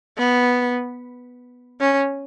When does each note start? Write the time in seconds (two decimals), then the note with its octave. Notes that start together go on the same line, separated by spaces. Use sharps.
0.18 B3
1.80 C#4